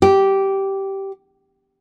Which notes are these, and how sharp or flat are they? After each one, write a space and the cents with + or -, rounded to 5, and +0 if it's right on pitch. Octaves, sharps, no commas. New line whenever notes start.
G4 -10